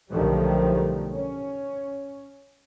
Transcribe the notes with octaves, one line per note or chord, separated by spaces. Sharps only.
B1 D3 D#3 F3 G3 A3
C#4